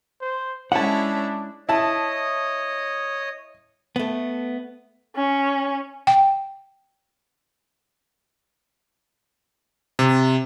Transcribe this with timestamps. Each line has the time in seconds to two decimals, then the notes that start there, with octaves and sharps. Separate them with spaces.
0.21 C5
0.72 G#3 C#4 D4 E4 F#5 A5
1.69 E4 C#5 D#5 A5 D#6
3.96 A3 B3
5.16 C#4
6.07 G5
9.99 C3